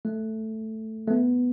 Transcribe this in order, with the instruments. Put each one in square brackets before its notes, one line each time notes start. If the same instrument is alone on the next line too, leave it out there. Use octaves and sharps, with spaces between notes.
[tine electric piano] A3
A3
B3